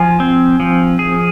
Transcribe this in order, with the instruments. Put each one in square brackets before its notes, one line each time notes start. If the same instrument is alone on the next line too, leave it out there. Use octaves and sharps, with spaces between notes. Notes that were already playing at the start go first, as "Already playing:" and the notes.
Already playing: [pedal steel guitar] F3 F4 [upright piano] G#5
[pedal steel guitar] C4
F3
G#4